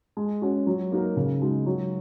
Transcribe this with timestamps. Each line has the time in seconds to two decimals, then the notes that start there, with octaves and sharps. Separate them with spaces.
0.17 G#3
0.42 C#4 F#4
0.67 F#3
0.92 A#3 D#4 F#4 A#4
1.17 C#3
1.41 G#3 D#4 F#4
1.66 F#3